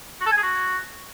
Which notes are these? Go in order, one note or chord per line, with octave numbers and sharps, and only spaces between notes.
F#4
A4
G#5
G#4
F#4